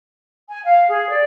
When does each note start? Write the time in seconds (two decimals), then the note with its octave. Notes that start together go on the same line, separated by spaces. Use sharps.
0.48 G#5
0.63 F5
0.89 G#4
1.10 D5